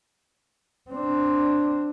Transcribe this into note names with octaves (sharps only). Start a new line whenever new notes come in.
C4 D4